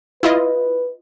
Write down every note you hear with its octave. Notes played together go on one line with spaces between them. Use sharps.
E4 F4 B4 D#5